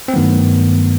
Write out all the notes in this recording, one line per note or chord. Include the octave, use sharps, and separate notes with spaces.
C4
G2 D#3 F#3 A3 B3